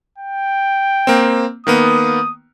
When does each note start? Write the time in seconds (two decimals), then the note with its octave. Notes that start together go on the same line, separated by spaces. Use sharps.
0.18 G5
1.07 A#3 C4
1.67 D#3 A#3 B3 D#6